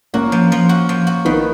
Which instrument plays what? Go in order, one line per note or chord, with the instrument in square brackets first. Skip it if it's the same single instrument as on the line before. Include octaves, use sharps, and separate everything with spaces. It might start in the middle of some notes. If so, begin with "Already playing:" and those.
[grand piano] A#3 C#4 [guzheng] F#4
[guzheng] F3
F3
F#4
F3
F#4
[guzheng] D#3 [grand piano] B3 D#4